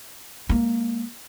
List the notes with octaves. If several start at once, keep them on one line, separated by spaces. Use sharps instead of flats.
G#3 A#3